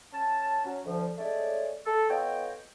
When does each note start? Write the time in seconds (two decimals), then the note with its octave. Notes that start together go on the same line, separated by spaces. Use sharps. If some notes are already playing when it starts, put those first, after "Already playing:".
0.13 C#4 A5
0.65 F#3 C#4
0.86 D2 F3
1.18 G#3 A3 C#4 A4 C#5 D5
1.86 A4
2.09 B3 F4 A4 C#5 D#5 G5